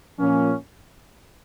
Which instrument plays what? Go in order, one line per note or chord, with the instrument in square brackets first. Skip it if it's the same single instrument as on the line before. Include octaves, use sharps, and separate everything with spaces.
[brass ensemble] A#2 F3 A#3 C#4